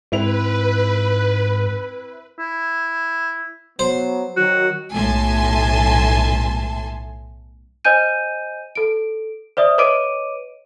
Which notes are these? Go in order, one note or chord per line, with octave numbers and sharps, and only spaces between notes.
G#2 C4 E4 B4 F7
E4
F#3 B3 C5
D#3 F#3 F#4
B1 A2 E5 G#5 A5 C6
C5 D#5 G#5 G6 D#7
A4 D7
C5 D5 E5 D#6
B4 C#5 D#5 D6 D7 D#7